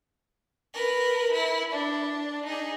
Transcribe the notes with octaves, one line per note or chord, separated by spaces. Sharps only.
A#4 B4
E4
D4
D#4 G#4